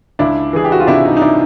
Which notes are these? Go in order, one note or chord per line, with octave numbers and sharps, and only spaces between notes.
C#2 D4 E4
E3 G#4
G4
F#4
F4
C3 D4 E4
D#4
D#4
D4 E4